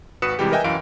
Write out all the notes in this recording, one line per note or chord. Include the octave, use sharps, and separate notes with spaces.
G#1 F#4 B4 D#6 C#7 E7
C3 E3 G3 G#3 G4
A#4 B4 D#5 E5 G5 G#5
F#2 E3 F5 D7